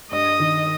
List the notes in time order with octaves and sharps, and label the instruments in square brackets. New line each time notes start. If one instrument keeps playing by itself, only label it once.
[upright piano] G2 [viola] D#5
[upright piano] D#3